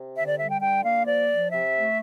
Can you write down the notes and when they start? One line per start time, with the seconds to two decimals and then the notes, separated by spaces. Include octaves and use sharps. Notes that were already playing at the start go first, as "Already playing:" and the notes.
Already playing: C3
0.15 D3 E5
0.27 D5
0.38 G3 E5
0.50 G5
0.61 D3 G5
0.84 A#3 F5
1.05 F3 D5
1.29 F3
1.51 C3 E5
1.74 A3